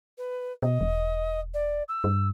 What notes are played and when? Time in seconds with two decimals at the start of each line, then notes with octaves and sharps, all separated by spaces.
0.18 B4
0.62 B2 D#5
0.81 E1
1.54 D5
1.88 E6
2.04 G2